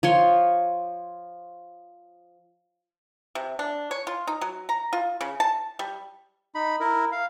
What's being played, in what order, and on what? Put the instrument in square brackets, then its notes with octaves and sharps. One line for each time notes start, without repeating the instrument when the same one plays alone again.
[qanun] F3 C#5 C6
[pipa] C3
D4
C#5
F4
D#4
F#3
A#5
F4
C#3
A5
G3
[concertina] D#4 B5
E4 A#4
F5